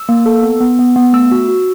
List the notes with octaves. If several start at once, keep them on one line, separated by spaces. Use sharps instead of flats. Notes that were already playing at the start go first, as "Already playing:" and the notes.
Already playing: E6
A#3
A4
B3
B3
B3
B3
A3 E6
F#4
F#4